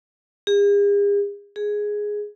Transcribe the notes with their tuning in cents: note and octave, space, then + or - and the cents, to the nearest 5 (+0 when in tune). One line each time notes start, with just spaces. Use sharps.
G#4 -45
G#4 +0